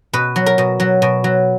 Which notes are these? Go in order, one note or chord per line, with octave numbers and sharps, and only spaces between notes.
B2 B4
F#3
A#4
B2
F#3
B2
F#3